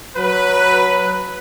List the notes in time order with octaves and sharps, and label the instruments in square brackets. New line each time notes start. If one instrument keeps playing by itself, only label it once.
[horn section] F#3 B4